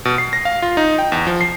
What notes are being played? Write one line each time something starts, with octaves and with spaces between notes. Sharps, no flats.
B2
C7
A#6
F5
F4
D#4
G5
E2
F3
C7